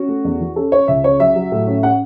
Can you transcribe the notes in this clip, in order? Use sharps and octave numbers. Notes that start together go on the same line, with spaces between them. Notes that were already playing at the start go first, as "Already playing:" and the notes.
Already playing: C#4 F#4
A3
E2
E3
C#4 A4
C#4 C#5
C#2 E5
C#3 C#5
F#3 E5
F#3
A2
C#4
C#4 F#5